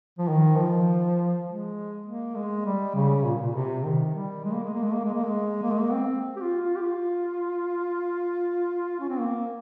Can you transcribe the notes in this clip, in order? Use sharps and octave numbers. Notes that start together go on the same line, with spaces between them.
F3
D#3
F3
G#3
A#3
G#3
G3
C#3
A#2
A#2
C3
D#3
G3
G#3
A#3
G#3
A#3
G#3
A#3
G#3
A#3
G#3
A#3
G#3
A#3
C4
G4
F4
F4
G4
F4
C#4
C4
A#3